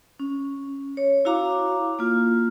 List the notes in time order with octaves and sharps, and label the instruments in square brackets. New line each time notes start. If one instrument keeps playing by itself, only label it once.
[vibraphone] C#4
C#5
E4 F#4 F5 A#5 D6
A#3 F4